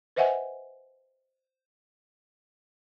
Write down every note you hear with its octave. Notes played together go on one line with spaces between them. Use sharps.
B4 C5 D#5 E5 F#5 G#5